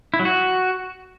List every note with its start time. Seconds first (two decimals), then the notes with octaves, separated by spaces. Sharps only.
0.14 E4
0.19 F#3
0.25 F#4